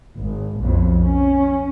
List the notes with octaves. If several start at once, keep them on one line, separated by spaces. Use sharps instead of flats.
G#1
B1 F2
C#4